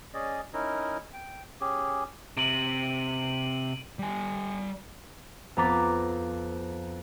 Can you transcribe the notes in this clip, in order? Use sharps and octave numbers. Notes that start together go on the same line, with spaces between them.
C#4 G#4 D5 D#5
C#4 D#4 E4 A#4
G5
C#4 G4 G#4
C3 D7 D#7 F#7
G3 G#5
F2 B3 A#5 D6 A6 B6